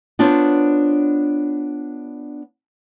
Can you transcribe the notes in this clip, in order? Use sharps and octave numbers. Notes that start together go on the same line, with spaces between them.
B3 D4 F4 C5 C#5